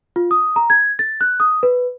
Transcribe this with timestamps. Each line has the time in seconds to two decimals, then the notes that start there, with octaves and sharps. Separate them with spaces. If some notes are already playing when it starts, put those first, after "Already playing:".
0.16 F4
0.31 D#6
0.56 A#5
0.70 G#6
0.99 A6
1.21 F#6
1.40 D#6
1.63 B4